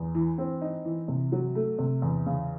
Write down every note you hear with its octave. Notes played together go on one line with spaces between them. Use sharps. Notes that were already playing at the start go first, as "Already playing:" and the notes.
Already playing: E2
E3
C4
D#4
E3
C3
F#3
A3
C3
E2
C#3